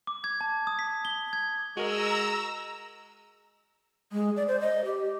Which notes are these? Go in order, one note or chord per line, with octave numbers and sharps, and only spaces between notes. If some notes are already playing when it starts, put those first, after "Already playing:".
D6
G#6
A5
D#6
B6
G7
G#6
G#3 F#4 A#4 D#5 A#5 E6
G#3
D5
C5
D#5
G4